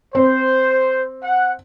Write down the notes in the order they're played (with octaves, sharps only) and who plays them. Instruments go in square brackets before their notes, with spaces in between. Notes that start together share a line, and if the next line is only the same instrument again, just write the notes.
[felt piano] C4 [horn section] C5
[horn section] F#5